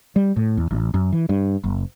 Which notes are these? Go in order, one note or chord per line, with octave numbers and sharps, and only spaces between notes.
G3
A2
E2
A1
F#2
E3
G2
F#1